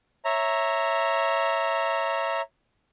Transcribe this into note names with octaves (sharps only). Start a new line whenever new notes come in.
C#5 E5 A#5